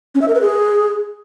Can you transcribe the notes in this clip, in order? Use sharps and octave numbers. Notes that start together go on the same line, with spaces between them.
C#4
E5
A#4
B4
G#4